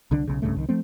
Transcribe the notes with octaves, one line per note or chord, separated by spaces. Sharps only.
C2 D3 D4
B1 C#3
C2 G2 C#3 A3
C2 D#3
F3 A3 C4